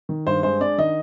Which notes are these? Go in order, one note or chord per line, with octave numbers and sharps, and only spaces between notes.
D#3
G2 C5
G#3 C5
D4 D5
D#3 D#5